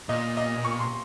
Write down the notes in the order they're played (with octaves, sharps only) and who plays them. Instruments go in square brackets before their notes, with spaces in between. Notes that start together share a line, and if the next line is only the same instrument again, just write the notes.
[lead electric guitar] A#2 [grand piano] D#5
[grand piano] D#5
C#6
C6